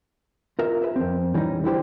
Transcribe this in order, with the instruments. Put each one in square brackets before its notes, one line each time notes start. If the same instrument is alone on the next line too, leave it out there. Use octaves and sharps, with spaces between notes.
[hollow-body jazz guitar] F4 A#4 D#5 E5
G#4 B4 E5
F2 C4
E3 G3 C#4 D#4
D3 E4 G4 C5